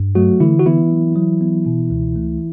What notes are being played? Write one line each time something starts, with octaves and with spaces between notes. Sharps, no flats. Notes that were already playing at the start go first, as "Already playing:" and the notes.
Already playing: G2
F#3 A3 F#4
D3 E3 E4
F#4
E3 B3 E4
F#3
F#3
B3
B2
C#2
A3